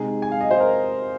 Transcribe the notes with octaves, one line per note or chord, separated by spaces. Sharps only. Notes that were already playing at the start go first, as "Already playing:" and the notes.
Already playing: C3 G#3 D#4 G#4
G#5
F5
D#5
C5
A#4